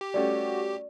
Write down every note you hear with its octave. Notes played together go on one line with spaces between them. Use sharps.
G4
G3 A3 C#4 F#4 D5